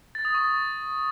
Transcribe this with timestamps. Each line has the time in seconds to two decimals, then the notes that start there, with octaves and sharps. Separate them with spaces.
0.15 A6
0.25 D#6
0.35 C#6
0.44 A6